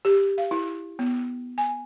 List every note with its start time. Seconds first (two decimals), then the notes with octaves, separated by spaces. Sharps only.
0.05 G4
0.38 F5
0.51 E4
0.99 B3
1.58 G#5